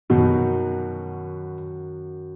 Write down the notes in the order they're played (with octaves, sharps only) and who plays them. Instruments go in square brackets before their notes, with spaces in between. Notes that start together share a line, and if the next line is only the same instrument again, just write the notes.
[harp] F#2 D#3 [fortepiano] B2